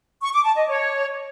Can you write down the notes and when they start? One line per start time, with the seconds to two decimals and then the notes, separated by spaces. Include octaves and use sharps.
0.21 C#6
0.33 D6
0.44 A5
0.56 D#5
0.67 C#5